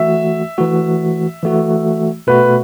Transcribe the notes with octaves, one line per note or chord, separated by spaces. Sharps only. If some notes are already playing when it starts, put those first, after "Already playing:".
Already playing: E3 A3 F#4 E5
E3 A3 F#4
E3 A3 F#4
B2 A3 F#4 B4